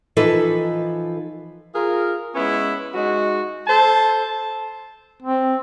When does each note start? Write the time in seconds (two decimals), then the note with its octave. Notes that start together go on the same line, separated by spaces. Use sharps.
0.17 E3 F3 D#4 A4 B4
1.75 F4 G#4 A#4
2.35 G#3 B3 C#4 E4
2.95 G#3 D#4 F#4
3.68 A4 C5 A5
5.23 C4